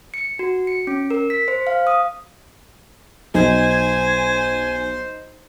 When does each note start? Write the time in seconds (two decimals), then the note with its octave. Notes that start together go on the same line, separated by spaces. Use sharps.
0.14 C#7
0.39 F#4
0.67 C#7
0.87 C#4
1.11 A#4
1.30 B6
1.48 C5
1.67 F5
1.87 D#6
3.34 B1 D#4 C5 G#5